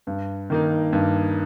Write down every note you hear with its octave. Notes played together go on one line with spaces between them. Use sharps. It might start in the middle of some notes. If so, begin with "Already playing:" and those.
G2
D#3 A#3 D#4
G2